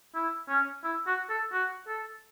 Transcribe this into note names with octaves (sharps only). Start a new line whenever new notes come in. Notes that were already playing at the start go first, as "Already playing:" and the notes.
E4
C#4
E4
F#4
A4
F#4
A4